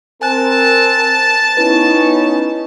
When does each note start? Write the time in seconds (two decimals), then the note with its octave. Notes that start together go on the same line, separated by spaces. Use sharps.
0.22 C4 A#4 C5 G#5 A5 F#6
1.57 B3 C#4 D#4 E4 B4